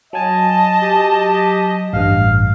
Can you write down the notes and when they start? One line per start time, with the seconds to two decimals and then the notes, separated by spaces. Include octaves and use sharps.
0.13 F#3 D#5 G#5 A5
0.82 G4
1.93 A1 G2 F5